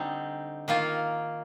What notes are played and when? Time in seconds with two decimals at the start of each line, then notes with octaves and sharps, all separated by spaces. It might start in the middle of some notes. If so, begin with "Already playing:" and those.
Already playing: D3 G3 C4 D#4
0.68 D#3 A#3 F4